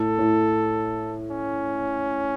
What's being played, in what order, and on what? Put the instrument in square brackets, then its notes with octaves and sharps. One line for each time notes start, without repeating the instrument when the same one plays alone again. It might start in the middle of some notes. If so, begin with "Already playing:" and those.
Already playing: [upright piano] A2 [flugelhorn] A4
[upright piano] A2
[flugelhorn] C#4